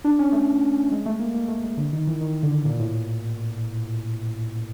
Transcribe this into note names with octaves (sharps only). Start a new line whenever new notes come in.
D4
C#4
A3
G#3
A3
A#3
A#3
A3
G#3
D3
D#3
E3
D#3
D3
A#2
A2